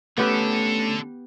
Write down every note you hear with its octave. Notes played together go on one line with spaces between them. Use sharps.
D3 A3 B3 C#4 G4 A4 B4